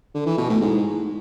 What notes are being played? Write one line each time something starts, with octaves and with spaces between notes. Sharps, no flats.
D3
E3
B2
A2
G#2